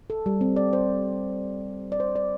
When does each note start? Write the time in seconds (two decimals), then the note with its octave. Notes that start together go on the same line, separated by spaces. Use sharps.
0.10 A4
0.26 G3
0.41 C4
0.56 D5
0.73 C5
1.92 D5
2.00 C5
2.16 D5